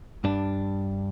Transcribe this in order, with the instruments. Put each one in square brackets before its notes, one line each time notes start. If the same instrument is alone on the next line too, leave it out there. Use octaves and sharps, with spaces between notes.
[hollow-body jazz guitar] G2 D4